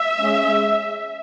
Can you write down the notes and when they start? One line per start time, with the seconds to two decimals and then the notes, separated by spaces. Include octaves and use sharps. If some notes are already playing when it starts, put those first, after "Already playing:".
Already playing: E5
0.20 G#3 C#4